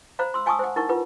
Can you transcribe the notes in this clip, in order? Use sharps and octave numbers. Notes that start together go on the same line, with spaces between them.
C5 F5 A#5 B5
C6 E6
F5 G#5 A5 C#6 D#6 E6
C5 F#5
D#4 E4 A#4 F#5 C#6
F4 B4 F#5